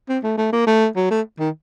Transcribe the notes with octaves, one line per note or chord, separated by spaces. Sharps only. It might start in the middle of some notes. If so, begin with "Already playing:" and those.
C4
A3
A3
A#3
A3
F#3
A3
D#3